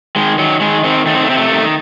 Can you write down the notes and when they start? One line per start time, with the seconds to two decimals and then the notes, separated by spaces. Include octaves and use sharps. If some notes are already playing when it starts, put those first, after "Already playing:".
0.16 D#3 G#3
0.39 D#3 F#3
0.61 D#3 G#3
0.84 D#3 C4
1.06 D#3 A3
1.14 C4
1.21 A3
1.29 C3 C4
1.38 A3
1.52 D#3